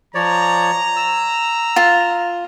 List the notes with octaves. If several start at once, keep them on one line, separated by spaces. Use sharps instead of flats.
F3 C#5 D5 A#5
E6
F4